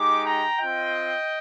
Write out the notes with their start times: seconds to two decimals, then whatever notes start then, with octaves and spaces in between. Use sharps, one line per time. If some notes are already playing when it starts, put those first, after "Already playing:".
Already playing: G#3 D#4 G4 D6
0.25 G5 A#5
0.60 C4 F4 D#5 G5